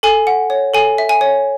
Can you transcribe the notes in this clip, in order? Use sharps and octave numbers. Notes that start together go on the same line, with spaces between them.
A4 G#5
F#5
C#5
A4 G#5
E5
G#5
C#5